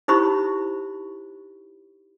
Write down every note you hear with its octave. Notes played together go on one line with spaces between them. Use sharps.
D#4 E4 G4 C5 B5 C#6